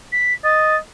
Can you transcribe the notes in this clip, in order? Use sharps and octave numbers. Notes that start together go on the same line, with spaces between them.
B6
D#5 A6